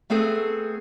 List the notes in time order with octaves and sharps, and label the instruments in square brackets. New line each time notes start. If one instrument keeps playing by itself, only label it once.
[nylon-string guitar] A3 B3 C4 G#4 A4